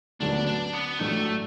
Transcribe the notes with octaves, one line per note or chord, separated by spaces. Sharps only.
D2 D3 F#3 B3 D4
D4
B3
A1 A2 F#3 A3 D4